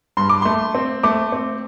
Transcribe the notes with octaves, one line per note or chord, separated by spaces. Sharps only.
G2 C6
D6
A3 C6
C4
A3 D6
C4